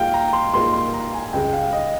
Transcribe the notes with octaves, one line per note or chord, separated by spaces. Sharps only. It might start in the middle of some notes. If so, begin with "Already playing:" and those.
Already playing: G#2 G3 A#3 F4 A#4 F5 G5
A#5
C6
G#2 G3 A#3 F4 A#4 C6
C6
A#5
G#5
C#2 C#3 G3 G5
F5
D#5